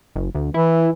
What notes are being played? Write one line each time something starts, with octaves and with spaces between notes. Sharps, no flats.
F#1
D2
E3 E4